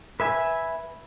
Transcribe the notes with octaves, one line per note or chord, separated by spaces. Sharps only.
B4 E5 G#5